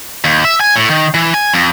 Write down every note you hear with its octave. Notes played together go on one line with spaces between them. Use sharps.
D#2
E5
G#5
A2
D#3
E3
G#5
F2